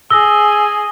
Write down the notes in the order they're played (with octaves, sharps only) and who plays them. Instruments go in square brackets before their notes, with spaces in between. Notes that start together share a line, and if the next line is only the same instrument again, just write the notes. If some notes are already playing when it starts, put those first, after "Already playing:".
[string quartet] G#4 [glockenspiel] D#6 A#6 G7 [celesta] E6